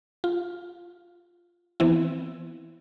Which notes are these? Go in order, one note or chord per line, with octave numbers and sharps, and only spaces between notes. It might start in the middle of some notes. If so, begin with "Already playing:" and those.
F4
E3 B3 C4 E4